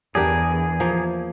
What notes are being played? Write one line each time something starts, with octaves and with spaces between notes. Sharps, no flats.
E2 D4 G4 G#4 A#4
F3 A#3